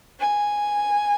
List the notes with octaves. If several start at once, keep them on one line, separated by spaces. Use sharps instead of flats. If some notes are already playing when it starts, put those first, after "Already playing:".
G#5